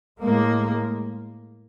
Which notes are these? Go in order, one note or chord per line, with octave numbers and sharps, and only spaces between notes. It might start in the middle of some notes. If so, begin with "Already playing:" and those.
A2 G#3 A#3